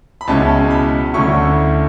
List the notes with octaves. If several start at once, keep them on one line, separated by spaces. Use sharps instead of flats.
B5
C#2 B2 G#3 C#4 E4 A5
B5
D2 D3 A3 C#4 E4 C#6